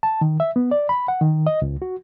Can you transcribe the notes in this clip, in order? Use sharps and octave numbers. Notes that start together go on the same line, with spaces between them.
A5
D#3
E5
B3
D5
B5
F#5
D#3
D#5
C#2
F#4